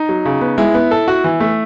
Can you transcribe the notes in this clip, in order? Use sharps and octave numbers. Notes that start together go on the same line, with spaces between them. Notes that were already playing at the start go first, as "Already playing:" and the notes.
Already playing: D#4
F#3
C#3
B3
G#3 E4
B3
A4
F#4
E3
A3